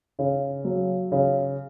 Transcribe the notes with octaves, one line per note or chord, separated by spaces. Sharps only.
C#3
F#3
C#3